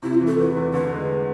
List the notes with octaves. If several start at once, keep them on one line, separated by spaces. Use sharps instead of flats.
C3 E4
F4
E3
A4
E2 B4
E2
D3 B4
G#3